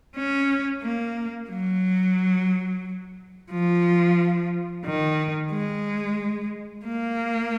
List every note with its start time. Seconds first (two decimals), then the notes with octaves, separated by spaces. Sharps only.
0.16 C#4
0.83 A#3
1.50 F#3
3.51 F3
4.86 D#3
5.52 G#3
6.86 A#3